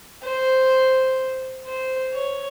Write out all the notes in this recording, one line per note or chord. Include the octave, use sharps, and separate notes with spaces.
C5
C5
C#5